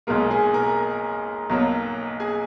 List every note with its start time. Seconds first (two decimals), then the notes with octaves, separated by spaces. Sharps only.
0.07 B1 B2 G#3 A#3 A#4
0.31 G#4 G#5
0.54 A#4 A#5
1.50 B1 B2 F#3 A#3
2.20 G#4 G#5